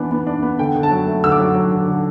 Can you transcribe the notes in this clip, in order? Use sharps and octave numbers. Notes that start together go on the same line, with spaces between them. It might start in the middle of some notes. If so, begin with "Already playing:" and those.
Already playing: E3 B3 D4
B3
D4
B3
D3 G5
D3
A5
F#3
A3
D3 E6
D6
F#3
F#3
D3
D3